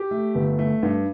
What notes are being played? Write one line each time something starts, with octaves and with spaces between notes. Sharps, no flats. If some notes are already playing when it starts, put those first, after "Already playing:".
Already playing: G4
A3
G1
A3
G2